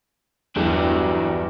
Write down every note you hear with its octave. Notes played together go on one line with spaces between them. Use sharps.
G1 E2 F#3 G3 D4